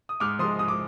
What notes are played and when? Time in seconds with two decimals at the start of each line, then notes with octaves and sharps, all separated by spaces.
0.09 D#6
0.20 G#2 D6 F6
0.39 F3 C6 D#6
0.43 G#3
0.59 G#2 D#6
0.68 D6